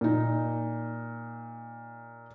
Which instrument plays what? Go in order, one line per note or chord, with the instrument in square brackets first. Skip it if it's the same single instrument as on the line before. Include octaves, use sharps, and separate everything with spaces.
[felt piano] A#2 D#4